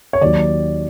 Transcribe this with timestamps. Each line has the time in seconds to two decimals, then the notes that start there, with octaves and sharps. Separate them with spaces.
0.13 C#5
0.21 D#2 D#3 F#3 D5